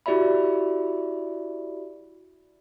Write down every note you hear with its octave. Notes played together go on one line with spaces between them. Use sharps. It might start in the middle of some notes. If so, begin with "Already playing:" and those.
E4 F#4 G4 D5 E5 B5